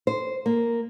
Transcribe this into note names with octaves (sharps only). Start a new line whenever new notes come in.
C5
A#3